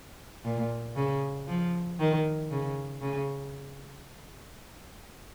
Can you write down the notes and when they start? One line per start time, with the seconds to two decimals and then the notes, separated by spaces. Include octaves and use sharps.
0.45 A#2
0.96 C#3
1.48 F3
2.00 D#3
2.51 C#3
3.01 C#3